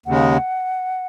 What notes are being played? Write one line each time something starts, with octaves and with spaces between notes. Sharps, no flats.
D#2 C#3 G#3 F#5